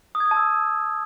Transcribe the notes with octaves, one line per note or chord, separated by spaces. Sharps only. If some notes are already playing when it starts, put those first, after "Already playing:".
D#6
G#6
D#6
A5
E6